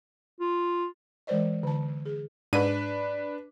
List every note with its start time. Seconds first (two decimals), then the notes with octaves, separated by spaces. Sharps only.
0.40 F4
1.27 E3 G#3 A#4 C5 D5 D#5
1.63 D3 A5
2.06 G#4
2.53 G#2 D4 B4 D#7